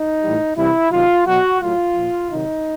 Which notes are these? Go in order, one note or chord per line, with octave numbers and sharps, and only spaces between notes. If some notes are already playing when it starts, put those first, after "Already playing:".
Already playing: D#4
A2 E3 G3
C3 E3 G3 E4
C3 D#3 F#3 F4
B2 F#3 F#4
A2 F#3 F4
A#2 F3
C3 D#3 F#3 D#4